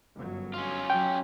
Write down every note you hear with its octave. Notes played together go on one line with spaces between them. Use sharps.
G1 F#2 F#3
C#4 F4
F#3 G5